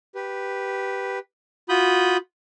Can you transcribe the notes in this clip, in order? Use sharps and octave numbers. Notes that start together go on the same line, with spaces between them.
G4 B4
F4 F#4 B5 D#6 G6